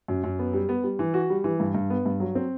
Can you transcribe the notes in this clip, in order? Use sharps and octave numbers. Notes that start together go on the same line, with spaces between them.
F#2
F#2
B3
G3
B3
G3
E3
F#4
G3
E3
G2
G2
B3
G2
F#3
C4